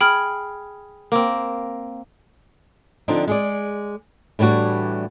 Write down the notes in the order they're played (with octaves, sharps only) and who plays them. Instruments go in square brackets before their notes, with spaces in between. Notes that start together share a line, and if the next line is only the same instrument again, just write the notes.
[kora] G#4 [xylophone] G5 B5 F6
[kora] A#3 C4
[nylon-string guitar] D3 F3 C4 D4 D#4
G#3 G#4 D5
A2 E3 G3 D4 F#4